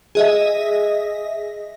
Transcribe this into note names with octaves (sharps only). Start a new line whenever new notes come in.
G#4 D#5 E5